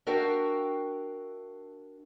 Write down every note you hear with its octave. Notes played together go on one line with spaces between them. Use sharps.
D4 F#4 A#4 E5 F5 G5